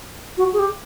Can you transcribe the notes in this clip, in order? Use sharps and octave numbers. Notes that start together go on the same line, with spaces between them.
F#4
G#4
G4